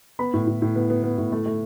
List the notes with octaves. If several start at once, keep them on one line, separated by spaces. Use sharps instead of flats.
B3 B5
A2
A2
A2
B3
B3
B3
A2
A3
A3